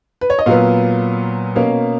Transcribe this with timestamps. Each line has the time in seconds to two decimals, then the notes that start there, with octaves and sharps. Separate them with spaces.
0.21 B4
0.30 C#5
0.39 D#5
0.46 A#2 F#3 B3 F5
1.56 B2 A#3 C#4 F5